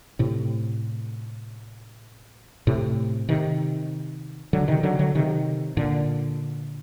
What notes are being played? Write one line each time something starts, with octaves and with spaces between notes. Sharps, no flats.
A2 C3
A2 C3
C3 D#3
D3 F#3
C3 D#3
D3 F#3
D3 F#3
C3 D#3
A#2 D3